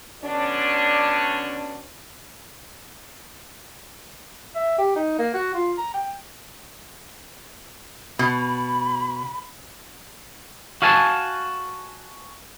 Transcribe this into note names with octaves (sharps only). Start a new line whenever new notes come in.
B2 D3 C#4 D4
E5
G4
D#4
A#3
F#4
F4
A#5
G5
B2 B5
F#4 F5 G#5 A5